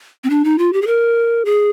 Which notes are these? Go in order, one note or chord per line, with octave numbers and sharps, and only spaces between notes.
C4
D4
D#4
F4
G4
G#4
A#4
G#4